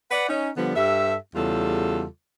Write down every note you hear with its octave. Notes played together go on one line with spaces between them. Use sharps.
B4 D5 F#5
C#4 D#4
D3 F3 G3 B3
G2 G4 A4 E5
E2 C#3 G3 F4 A4